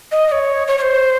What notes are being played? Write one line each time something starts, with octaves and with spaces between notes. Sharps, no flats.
D#5
D#5
C#5
C#5
C#5
C5